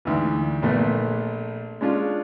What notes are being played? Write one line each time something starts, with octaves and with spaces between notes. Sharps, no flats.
D2 G#2 E3
A#1 A#2 A3 B3
G#3 C#4 D4 F4